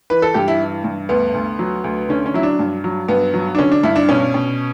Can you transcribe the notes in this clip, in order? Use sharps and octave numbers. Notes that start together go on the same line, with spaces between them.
E3 B4
A4
G2 G4
E4
E3
G2
D2 B3
D2
F#3
D2
D3 C#4
C#4
F#3 E4
D4
G2
F#3
G2 B3
F#3
D4
D3 C#4
D4
G2 E4
D4
B2 C#4
B2